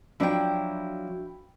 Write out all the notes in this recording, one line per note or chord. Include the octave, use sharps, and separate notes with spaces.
F3 F#3 D4 E4 G5